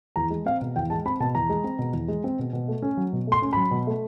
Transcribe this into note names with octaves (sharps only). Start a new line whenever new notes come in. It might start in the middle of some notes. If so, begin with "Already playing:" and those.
E2 A#5
G#3
C4 F5
B2
E2 G5
G#3 A5
C4 B5
B2 A5
E2 A#5
G#3
C4
B2
E2
G#3
C4
B2
B2
A3
C#4
F#3
B2
A3 C6
C#4
F#3 B5
B2
A3